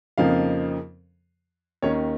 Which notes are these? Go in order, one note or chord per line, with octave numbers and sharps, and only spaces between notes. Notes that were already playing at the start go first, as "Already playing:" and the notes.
F2 C#3 F3 A#3 D#4 F5
D#2 D#3 C#4 C#5